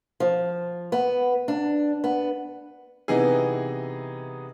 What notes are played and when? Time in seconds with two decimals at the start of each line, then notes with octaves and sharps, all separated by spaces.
0.20 F3
0.92 B3
1.48 D4
2.04 B3
3.08 C3 E3 B3 D#4 G#4